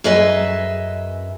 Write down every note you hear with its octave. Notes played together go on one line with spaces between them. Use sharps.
F#2 G#4 B4 D#5 E5 G#5